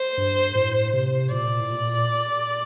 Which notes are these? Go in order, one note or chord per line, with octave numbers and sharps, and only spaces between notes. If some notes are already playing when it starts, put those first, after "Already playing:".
Already playing: C5
G2
A2
C3
A#2 D5
A2
A#2